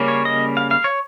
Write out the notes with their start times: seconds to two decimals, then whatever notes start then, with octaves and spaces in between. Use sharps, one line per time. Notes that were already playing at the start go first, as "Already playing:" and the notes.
Already playing: C#3 G3 A#3 C#4
0.08 C#5
0.25 D#5
0.57 F5
0.71 F5
0.84 C#5